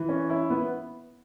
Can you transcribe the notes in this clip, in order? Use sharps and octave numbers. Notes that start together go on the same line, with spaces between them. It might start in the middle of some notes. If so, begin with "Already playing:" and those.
Already playing: E3
C#4
E4
B3